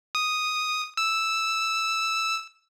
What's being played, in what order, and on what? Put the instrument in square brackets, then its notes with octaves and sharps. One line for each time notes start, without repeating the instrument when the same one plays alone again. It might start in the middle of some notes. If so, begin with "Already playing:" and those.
[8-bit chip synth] D#6
E6